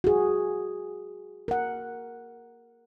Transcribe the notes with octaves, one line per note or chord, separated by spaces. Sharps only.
F#4 G#4
A#4 F#5